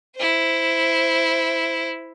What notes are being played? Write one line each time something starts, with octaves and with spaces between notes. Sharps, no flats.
E4 C5